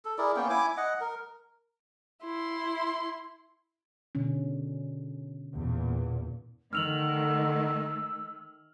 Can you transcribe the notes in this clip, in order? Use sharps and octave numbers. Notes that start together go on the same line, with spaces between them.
A4
E4 G#4 A#4 D5
A#3 B3 C#4 G5
E4 G#5 D6
D#5 F#5
A#4
E4 C6
B2 D3 C#4
E2 A#2
D3 D#3 A3 E6 F6 F7 F#7